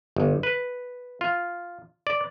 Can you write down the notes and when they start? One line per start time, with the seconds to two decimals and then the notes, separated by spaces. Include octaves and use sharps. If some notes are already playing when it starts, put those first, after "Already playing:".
0.17 G1
0.43 B4
1.21 F4
2.07 D5